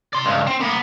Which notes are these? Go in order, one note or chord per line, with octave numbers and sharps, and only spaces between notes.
D5 C6
C#2 G2
C4
A#3 B3